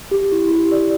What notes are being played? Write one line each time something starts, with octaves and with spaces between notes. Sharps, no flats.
G4
E4
G4
D5